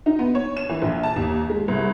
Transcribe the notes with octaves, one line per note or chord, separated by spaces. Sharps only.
D#4
B3
C#5
E7
E3
A#1
A5
D#2
G#3
C2